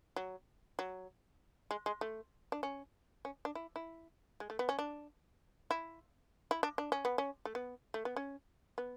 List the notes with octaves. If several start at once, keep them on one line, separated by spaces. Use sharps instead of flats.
F#3
F#3
G#3
G#3
A3
D4
C#4
C#4
D4
E4
E4
G#3
A3
B3
C#4
D4
E4
E4
D4
D4
C#4
B3
C#4
A3
B3
A3
B3
C#4
B3